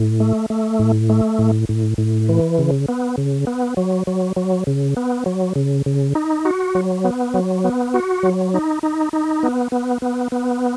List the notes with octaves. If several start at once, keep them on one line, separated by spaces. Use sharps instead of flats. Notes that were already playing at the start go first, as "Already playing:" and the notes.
Already playing: A2
A3
A3
A2
A3
A2
A2
A2
E3
C#3
B3
C#3
B3
F#3
F#3
F#3
C#3
B3
F#3
C#3
C#3
D#4
F#4
F#3
B3
F#3
B3
F#4
F#3
D#4
D#4
D#4
B3
B3
B3
B3